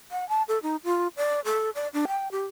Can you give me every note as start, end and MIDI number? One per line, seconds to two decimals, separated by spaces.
0.11 0.27 78
0.29 0.42 81
0.48 0.59 69
0.63 0.76 63
0.84 1.08 65
1.17 1.40 74
1.45 1.70 69
1.75 1.88 74
1.93 2.06 62
2.08 2.31 79
2.31 2.46 67